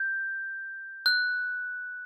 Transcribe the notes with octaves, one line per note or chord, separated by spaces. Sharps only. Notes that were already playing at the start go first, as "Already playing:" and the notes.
Already playing: G6
F#6